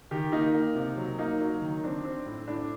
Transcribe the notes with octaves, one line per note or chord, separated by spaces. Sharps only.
D#3 G4
A#3 D#4
A#3
C3
F#3
A#3 D#4
F#3
D#3
C4 D4
C4
A2
A2 D4